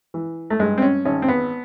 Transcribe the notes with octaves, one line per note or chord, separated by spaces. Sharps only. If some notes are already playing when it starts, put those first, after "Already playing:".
E3
A3
G2 G#3
C4
C#4
G#1 C#4
C4
B3